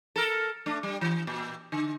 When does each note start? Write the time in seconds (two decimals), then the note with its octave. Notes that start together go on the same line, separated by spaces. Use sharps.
0.16 A4 A#4
0.66 A3 D4
0.83 G3
1.01 E3
1.27 A#2
1.72 D3